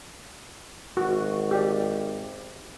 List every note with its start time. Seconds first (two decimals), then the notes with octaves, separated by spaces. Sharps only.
0.97 G#1 F#4
1.51 G4 D5